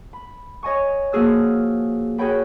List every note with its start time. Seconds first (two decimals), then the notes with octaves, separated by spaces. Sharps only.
0.13 B5
0.63 C#5 D#5 G#5 C#6
1.12 F3 A#3 F#4 G#4 E6 F6
2.18 F#4 G#4 A#4 C#5 G5 B5